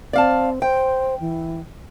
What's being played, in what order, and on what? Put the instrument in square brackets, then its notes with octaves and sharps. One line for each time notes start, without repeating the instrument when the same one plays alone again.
[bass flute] C4 [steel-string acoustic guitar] D5 F5 A5
[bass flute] C5 [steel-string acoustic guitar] G5
[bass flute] E3